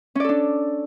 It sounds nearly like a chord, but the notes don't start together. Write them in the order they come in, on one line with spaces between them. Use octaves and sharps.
C#4 D5 A4 D4